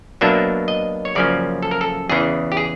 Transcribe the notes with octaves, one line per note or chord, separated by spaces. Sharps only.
B2 F#3 A#3 D4 E5
D#5
C#5
F#2 C#3 F3 A#3 C#4 D5
A4
A#4
A4
E2 C#3 E3 G#4
G4
G#4